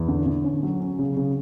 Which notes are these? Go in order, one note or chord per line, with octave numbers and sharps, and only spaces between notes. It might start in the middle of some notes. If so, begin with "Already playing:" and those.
Already playing: E2
D3
D3
C#4
F#3
C#4
C#3
C#3